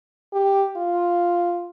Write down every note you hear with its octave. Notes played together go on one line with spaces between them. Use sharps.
G4
F4